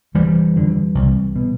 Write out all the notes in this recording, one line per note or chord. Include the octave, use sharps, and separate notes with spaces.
F1 E3 G3
F2 D3
C2
B2